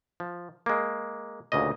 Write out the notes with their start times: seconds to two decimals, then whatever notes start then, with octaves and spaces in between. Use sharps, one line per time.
0.20 F3
0.66 G#3 A#3
1.52 D2 A#2 C#3 D#5